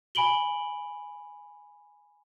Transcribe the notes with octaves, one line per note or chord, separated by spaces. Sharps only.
G#5 B5 D7 F#7 G7